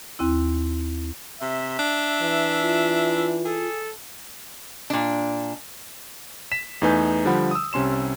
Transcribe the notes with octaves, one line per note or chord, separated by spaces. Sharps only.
D#2 C4 E4
C3 E5
D4
E3
F4
G#4 A4
A#2 D4
B6 E7
E2 A3 D#4 B4 G#5 G6
D3 F3 G3 F#5 B5
D#6 E6
C2 C3 C#4 C6 E7